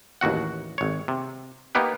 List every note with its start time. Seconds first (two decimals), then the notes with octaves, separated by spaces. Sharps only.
0.21 A1 D#2 F#4 F#5
0.78 G#1 C#5
1.08 C3
1.75 A#3 B3 D#4 G4 B4